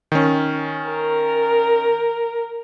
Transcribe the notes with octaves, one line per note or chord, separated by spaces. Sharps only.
D#3 C#4
A#4